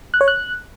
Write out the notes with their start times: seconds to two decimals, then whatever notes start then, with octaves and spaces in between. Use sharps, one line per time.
0.14 F#6
0.21 C#5
0.28 F#6